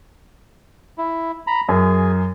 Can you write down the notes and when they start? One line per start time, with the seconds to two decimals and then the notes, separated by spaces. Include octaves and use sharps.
0.98 E4
1.47 A#5 B5
1.69 F#2 G#4